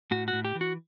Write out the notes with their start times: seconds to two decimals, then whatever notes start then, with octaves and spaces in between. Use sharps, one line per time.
0.11 A2 F#4
0.28 F#4
0.33 A2
0.45 G4
0.55 E3
0.61 F#4